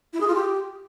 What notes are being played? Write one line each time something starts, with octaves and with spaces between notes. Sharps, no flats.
E4
G#4
F4
G4